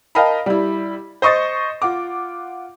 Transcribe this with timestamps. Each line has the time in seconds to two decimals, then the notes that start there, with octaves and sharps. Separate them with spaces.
0.15 A#4 D#5 F5 G5 A5 B5
0.46 G3 E4
1.22 C5 D#5 C#6 D#6 A6
1.82 F4 F#5 D6